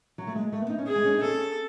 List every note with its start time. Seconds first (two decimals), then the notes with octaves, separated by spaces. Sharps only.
0.18 F#3
0.27 A3
0.36 G#3
0.52 A3
0.61 B3
0.70 D#4
0.78 C#4
0.87 G#4
0.96 G#3
1.05 C#4
1.13 D#4
1.22 C#4 A4